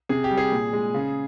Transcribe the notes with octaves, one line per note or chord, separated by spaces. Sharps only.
C3 G#4
G4
G3
G#4
A#2
G#3
C#3